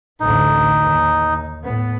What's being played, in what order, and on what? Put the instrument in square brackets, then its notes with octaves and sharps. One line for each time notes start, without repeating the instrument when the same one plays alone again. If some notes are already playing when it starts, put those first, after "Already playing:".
[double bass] A1 D2 [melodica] D#4
[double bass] D#2
A2 B3